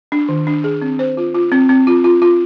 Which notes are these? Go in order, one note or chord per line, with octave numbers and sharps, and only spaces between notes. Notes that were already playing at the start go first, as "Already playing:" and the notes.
D4
D#3
D4
G#4
C4
C5
F4
F4
C4
C4
F4
F4
F4